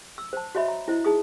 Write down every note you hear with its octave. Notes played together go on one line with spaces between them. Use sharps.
E6
C5 A5
F#4 C#5 D#5 E5 B5
A#5
E4 C5 D#5
D#4 G#4 D#6